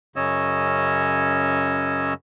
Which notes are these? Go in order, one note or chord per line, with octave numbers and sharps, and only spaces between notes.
F#2 C#3 C#4 C#5 D#5 E6